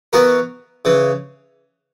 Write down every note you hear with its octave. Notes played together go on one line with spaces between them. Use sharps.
E3 B3 F#4 A#4
C#3 E3